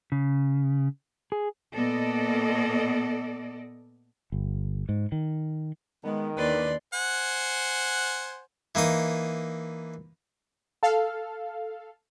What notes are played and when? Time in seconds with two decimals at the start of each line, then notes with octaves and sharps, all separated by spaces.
0.12 C#3
1.32 G#4
1.73 A#2 B3 A4 D5 D#5
4.32 G1
4.89 G#2
5.12 D#3
6.04 D#3 G#3 B3
6.38 D#2 E3 D4 B4 D5 C6
6.94 C5 F#5 G#5
8.75 E3 A#3 D#4 D#6
10.83 A4 F5